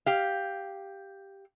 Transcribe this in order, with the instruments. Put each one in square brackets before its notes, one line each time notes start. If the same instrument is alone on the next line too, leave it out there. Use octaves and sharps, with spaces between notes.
[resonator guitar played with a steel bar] G4 F5